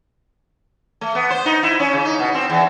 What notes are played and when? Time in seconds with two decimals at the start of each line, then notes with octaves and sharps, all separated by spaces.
1.01 A3
1.15 B3
1.30 C5
1.45 D#4
1.63 E4
1.80 C#4
1.93 C#3
2.05 D#4
2.19 B2
2.34 C4
2.49 E2